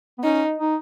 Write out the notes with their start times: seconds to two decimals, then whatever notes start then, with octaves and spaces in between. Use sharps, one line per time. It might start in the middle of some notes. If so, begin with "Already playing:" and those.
0.18 B3
0.24 C#4 D#4
0.58 D#4